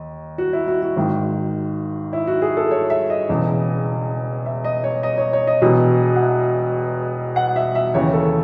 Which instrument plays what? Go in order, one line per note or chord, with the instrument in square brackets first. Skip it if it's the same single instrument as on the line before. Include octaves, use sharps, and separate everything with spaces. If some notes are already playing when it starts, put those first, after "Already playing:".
Already playing: [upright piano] D#2 D#5
F#4
E4
F#4
F#4
G#1 G#2 D#3
E4
F#4
G#4
A4
C#5
E5
D#5
E1 E2 C#3
E5
D#5
C#5
D#5
C#5
C#5
D#5
E1 E2 B2
F#5
E5
F#5
E5
E5
D#2 C#3 E3 C#5
A4